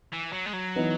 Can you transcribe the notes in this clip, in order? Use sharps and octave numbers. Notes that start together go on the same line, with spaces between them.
E3
F#3
G#3
F#3
E3 B3 D#4